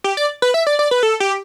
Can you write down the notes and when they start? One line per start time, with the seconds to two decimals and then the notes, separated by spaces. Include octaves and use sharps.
0.04 G4
0.17 D5
0.42 B4
0.54 E5
0.67 D5
0.79 D5
0.91 B4
1.03 A4
1.20 G4